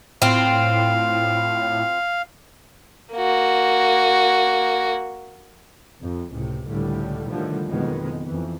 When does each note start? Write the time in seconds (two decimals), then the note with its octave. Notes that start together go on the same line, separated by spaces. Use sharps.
0.22 A2 C4 F4 F5
3.14 A#3 F#4
6.00 F2
6.31 C#2 A2 C3
6.68 C#2 A2 D3 G3
7.29 A2 D3 D#3 F3 G3
7.67 F#1 F2 B2 D#3 G#3 B3
8.25 F2 E3